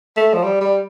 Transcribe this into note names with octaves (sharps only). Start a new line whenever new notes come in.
A3
F3
G3
G3